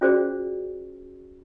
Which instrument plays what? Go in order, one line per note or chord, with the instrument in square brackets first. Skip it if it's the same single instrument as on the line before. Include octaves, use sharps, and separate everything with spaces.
[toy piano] C#4 F4 F#4 G#4 C5 D5